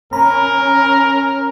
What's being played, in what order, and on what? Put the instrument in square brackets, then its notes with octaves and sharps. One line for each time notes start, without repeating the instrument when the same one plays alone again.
[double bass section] C#4 [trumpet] A#4 [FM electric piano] A#5 B5